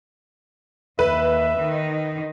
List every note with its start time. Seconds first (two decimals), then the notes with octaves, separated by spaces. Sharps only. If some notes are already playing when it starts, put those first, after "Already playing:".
0.99 D#2 B4 E5
1.58 D#3 D#4